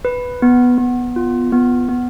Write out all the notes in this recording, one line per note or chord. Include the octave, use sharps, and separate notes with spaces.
B4
B3
B3
F4
B3
B3